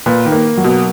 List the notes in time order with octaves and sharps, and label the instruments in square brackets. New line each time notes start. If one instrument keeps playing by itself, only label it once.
[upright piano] A#2 [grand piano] B4
[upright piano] D#3
[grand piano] A#3
F#3
[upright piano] B2